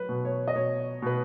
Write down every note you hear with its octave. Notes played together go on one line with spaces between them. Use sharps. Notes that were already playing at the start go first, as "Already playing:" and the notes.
Already playing: F#3 B4
B2
C#5
D#5
B2 C#5
B2 B4